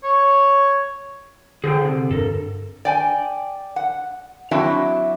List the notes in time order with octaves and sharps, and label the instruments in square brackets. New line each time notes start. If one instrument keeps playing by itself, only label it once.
[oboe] C#5
[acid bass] D3 [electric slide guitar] G#4 C5 G5
[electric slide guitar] C3
[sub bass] G2 [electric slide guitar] A4 A#4
[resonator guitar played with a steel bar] D5 G5 G#5
F#5
F#3 C4 D4 E4 F#4 E5